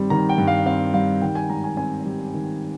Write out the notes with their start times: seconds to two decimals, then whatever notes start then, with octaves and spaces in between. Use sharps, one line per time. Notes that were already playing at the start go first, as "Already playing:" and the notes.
Already playing: G2 D#3 G3 C4
0.10 D#3 A#5
0.29 G5
0.38 G2
0.47 F5
0.66 C4 F5
0.94 G3 F5
1.21 D#3 G5
1.35 G#5
1.50 G#2 A#5
1.64 G#5
1.77 C4 G#5
2.06 G3
2.34 D#3